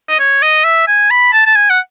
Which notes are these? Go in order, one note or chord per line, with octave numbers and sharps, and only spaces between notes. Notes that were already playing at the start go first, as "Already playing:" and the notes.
D#5
C#5
D#5
E5
G#5
B5
A5
A5
G#5
F#5